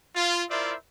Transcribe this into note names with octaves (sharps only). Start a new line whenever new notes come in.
F4
E4 F4 A#4 C5 D5 E5